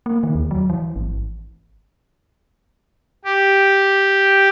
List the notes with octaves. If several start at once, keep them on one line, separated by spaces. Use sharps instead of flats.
A#3
D#3
D#2
F#3
E3
G#1
G4